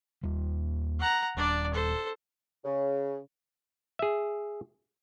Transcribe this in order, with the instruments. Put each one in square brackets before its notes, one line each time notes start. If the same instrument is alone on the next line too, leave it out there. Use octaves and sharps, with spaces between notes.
[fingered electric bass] D#2 G3
[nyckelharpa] F#5 A#5
[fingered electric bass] D#1 [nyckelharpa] D4 D5
[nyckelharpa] A4 C5
[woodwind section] C#3
[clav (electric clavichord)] G#4 E5